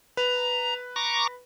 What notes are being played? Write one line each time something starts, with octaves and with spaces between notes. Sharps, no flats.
B4 A#5
A#5 C#6 D6 A#6